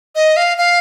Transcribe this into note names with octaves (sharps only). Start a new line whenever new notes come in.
D#5
F5
F5